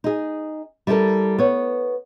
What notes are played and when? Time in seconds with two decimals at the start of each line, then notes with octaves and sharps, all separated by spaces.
0.04 D#4 G#4
0.87 G3 E4 G4 A4 A#4
1.39 B3 C#5